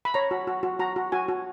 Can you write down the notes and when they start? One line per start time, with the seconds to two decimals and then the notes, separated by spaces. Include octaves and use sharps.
0.05 B5
0.14 C#5 A#5
0.31 F#4
0.47 F#4
0.63 F#4
0.79 F#4 A#5
0.96 F#4
1.12 F#4 G#5
1.28 F#4